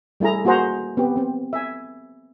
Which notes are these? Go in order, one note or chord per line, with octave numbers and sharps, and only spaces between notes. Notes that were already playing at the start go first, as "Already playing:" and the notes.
G3 A3 E4 G#4 A#5
A#3 F#4 G#4 C5 F#5 A#5
B3 C4 G4
B3 C4
E5 G#5